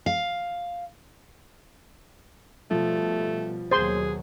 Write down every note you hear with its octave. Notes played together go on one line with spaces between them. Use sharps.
F5
B2 F3 G3 A3
D#2 B2 F#3 G#4 C5 C6